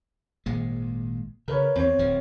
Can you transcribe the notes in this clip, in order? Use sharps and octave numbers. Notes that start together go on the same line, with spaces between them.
G#1 A#2 G#3
C#3 A#4 B4 C#5
E2 C4 C#5
D1 F3